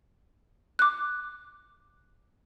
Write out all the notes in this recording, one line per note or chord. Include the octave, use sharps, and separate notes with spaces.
D6 F#6